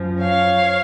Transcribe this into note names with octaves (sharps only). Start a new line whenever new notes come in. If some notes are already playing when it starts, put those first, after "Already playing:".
Already playing: F#2 F3
C#5 F5